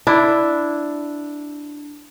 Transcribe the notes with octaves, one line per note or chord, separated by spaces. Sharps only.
D4 E4